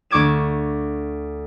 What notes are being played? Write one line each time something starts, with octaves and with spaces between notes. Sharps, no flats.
D2 C#6 D6 G#6 E7